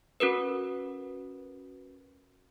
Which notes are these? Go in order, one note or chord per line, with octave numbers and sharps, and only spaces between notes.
C#4 F#4 A#4 B4